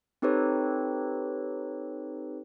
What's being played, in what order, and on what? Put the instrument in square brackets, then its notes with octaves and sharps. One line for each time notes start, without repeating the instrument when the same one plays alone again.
[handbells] C4 D#4 G4 A4 B4 C#5